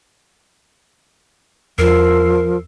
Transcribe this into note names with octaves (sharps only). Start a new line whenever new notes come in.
E2 F3 A#4 E6 C7